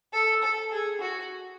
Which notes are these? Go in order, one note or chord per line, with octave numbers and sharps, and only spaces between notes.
A4
A4
G#4
F#4